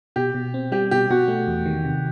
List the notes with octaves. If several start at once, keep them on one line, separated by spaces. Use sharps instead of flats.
B2 G4
B2
C4
G3 G4
B2 G4
B2 F#4
A3
E2
D#3
C3